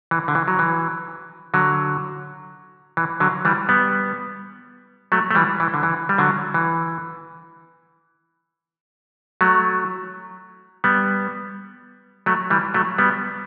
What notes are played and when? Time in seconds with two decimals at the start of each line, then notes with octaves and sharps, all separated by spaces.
0.11 E3
0.28 D3
0.35 E3
0.48 F#3
0.59 E3
1.54 D3 F#3
2.97 E3
3.20 D3 F#3
3.45 E3 G3
3.69 G3 B3
5.12 F#3 A3
5.31 A3
5.35 E3 G3
5.60 E3
5.74 D3
5.83 E3
6.09 G3
6.18 D3 F#3
6.54 E3
9.41 F#3 A3
10.84 G3 B3
12.26 F#3 A3
12.50 E3 G3
12.74 F#3 A3
12.98 G3 B3